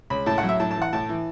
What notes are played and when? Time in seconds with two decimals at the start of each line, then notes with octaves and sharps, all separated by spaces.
0.10 C#2 B5
0.26 A2 A5
0.38 F#5
0.43 F#3
0.49 E5
0.60 A2 A5
0.71 A5
0.76 E3
0.82 F#5
0.93 A2 A5
1.09 E3